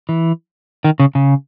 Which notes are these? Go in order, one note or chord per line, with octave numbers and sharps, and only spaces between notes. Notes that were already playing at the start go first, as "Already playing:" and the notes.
E3
D#3
C#3
C#3